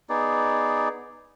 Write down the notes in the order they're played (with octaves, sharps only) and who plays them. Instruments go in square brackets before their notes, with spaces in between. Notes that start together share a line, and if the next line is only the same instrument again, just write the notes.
[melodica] B3 D#4 G#4 D5